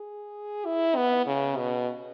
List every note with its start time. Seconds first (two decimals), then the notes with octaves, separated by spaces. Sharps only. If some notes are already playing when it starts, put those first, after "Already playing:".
Already playing: G#4
0.66 E4
0.96 B3
1.26 C#3
1.57 B2